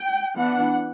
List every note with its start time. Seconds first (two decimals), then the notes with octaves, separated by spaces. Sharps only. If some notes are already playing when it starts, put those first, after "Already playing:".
Already playing: G5
0.37 E3 B3 D4 F#5